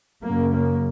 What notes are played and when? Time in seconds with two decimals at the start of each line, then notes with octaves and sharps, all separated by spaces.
0.23 F#2 C#3 A#3
0.53 A#3